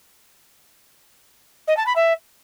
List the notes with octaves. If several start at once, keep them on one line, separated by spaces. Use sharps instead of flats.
D#5
A5
B5
E5